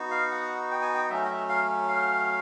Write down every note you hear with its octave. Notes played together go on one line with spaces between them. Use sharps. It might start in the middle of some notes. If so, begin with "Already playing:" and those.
Already playing: B3 D#4 F#4
F5
F#5
G5
G#5
G5
F#3 A3 C#4 E5
D#5
E5
F5
F5